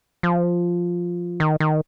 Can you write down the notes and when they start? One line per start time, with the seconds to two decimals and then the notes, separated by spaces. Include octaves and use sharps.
0.23 F3
1.40 D#3
1.60 D#3